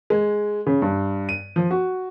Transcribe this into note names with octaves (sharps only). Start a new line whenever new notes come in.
G#3
C#3
G2
D#7
F3
F#4